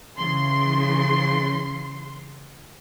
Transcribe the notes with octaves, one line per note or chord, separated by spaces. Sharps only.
C#3 E3 C6